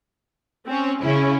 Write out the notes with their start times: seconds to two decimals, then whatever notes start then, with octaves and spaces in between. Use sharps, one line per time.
0.67 C4 C#4
1.03 C#3 C#4 E4